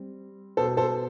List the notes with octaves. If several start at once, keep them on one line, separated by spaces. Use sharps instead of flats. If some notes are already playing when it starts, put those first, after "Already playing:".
Already playing: G3 C4
B2 B3 A4 C5
A4 C5